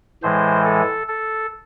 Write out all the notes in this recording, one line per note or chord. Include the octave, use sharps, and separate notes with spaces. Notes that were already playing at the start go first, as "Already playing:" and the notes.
A2 E3 G#3 C5
A4
A4